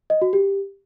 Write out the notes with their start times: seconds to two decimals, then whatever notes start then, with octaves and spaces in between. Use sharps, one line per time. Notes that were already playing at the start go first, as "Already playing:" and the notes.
0.10 D#5
0.22 F#4
0.33 G4